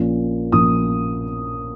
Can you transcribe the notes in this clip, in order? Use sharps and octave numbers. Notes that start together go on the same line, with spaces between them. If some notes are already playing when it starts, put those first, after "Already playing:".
Already playing: A#1 A#2 F3 A#3 C#4
A#1 A#2 F3 A#3 C#4 D#6